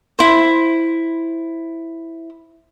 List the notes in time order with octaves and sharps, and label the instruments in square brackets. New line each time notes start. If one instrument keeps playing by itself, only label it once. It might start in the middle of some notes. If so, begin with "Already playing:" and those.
[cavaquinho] E4 C5